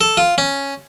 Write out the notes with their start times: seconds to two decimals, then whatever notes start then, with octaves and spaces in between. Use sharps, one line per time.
0.01 A4
0.17 F4
0.38 C#4